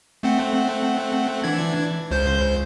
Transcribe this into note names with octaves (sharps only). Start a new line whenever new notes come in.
A3 C4 F#5
E3 D4 G#6
C#2 C5 G6